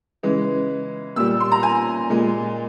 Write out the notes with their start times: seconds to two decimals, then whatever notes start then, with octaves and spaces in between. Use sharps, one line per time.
0.23 C#3 E3 G#3
1.16 A#2 G3 E6
1.40 C6
1.52 A#5
1.63 G#5
2.10 A#2 G#3